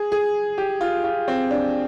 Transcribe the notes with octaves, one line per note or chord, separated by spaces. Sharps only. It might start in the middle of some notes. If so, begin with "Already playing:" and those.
Already playing: G#4
G#4
G4
F4
F4
C4
D4